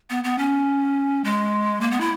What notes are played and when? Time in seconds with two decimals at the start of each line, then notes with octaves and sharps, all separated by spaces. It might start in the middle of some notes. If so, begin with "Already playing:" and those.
0.10 B3
0.24 B3
0.38 C#4
1.24 G#3
1.81 A#3
1.91 B3
2.00 E4